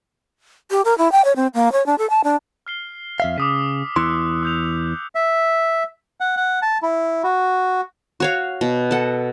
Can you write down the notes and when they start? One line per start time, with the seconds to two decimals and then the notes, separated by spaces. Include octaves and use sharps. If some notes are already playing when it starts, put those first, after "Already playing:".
0.71 G4
0.85 A#4
0.98 E4
1.12 G5
1.25 C#5
1.36 C4
1.54 A#3
1.72 C#5
1.86 D4
1.98 A4
2.10 A5
2.24 D4
2.67 F6 C7 G7
3.20 F2 E5 F5
3.38 C#3 D6 D#6 B6
3.96 E2 E4 C6 E6 F#6 C#7
4.43 D#6 G6 F7
5.15 E5
6.21 F#5
6.37 F#5
6.62 A5
6.82 E4
7.24 F#4
8.20 F#4 C#5 F5
8.61 B2
8.91 A4 F#5